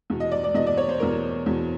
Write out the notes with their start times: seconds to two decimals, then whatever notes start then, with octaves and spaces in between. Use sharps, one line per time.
0.10 E2 B2
0.20 D#5
0.32 D5
0.44 D5
0.54 E2 B2 D#5
0.67 D5
0.77 C#5
0.89 C5
1.00 E2 B2 A#4
1.46 E2 B2